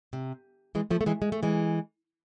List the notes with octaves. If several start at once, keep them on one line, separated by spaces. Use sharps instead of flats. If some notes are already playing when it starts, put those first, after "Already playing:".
C3
E3 G#3
F3 A3
A3
E3 G#3
G#3
A3
E3 G#3